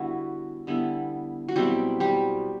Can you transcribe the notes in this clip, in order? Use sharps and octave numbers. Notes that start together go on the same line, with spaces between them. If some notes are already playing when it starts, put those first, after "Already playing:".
Already playing: D3 G3 B3 E4 F#4
D3 G3 B3 E4
F#4
B2 F#3 G3 C4 E4 G4
G3 G4